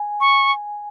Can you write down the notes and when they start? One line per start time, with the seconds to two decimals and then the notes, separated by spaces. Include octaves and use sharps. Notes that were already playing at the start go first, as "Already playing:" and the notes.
Already playing: G#5
0.21 C#6